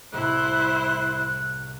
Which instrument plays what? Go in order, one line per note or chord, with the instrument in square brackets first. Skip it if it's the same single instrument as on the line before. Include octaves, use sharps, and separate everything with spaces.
[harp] C2 A2 C3 [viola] E4 C5 [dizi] F#6